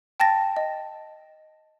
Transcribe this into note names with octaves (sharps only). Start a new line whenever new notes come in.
G5 A5 A6 A#6
D#5